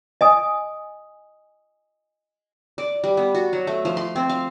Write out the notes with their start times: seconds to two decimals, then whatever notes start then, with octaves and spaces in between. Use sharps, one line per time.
0.21 D#5 G#5 D#6
2.78 D5
3.04 G3
3.17 B3
3.35 F#4
3.53 F#3
3.67 A3
3.85 F3
3.97 C6
4.16 C4
4.29 F5